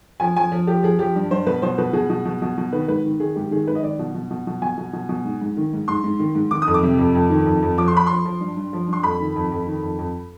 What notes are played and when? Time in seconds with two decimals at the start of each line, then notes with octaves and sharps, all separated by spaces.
0.20 F3 G#5
0.36 F3 G#5
0.52 F3
0.67 F3 G4
0.83 F3 G#4
0.99 F3 G4
1.16 G2
1.31 G2 C5
1.47 B2 B4
1.62 B2 C5
1.78 B2 B4
1.93 B2 G#4
2.10 B2
2.25 B2
2.42 B2
2.58 B2
2.73 D#3 B4
2.88 G#2 B4
3.04 D#3
3.20 D#3 G#4
3.36 G#2 G4
3.51 D#3 G#4
3.67 G#2 B4
3.75 D#5
3.83 D#3 D5
3.99 B2
4.15 B2
4.30 B2
4.47 B2
4.62 B2 G#5
4.77 B2
4.93 B2
5.09 B2
5.25 G#2
5.42 G#2
5.57 D#3
5.73 G#2
5.88 G#2 C6
6.04 G#2
6.20 D#3
6.35 G#2
6.51 D#3 D6
6.62 D#6
6.67 F2
6.74 D6
6.83 C3
6.99 F2
7.15 F2
7.30 D#3
7.46 F2
7.62 F2
7.77 F3 D6
7.88 C6
7.93 F3 B5
8.07 F3 C6
8.25 F3
8.41 G2
8.57 G2
8.73 F3
8.88 G2 C6
9.03 F2 B5
9.20 D#3
9.36 F2
9.51 F2
9.67 D#3
9.82 F2
9.99 F2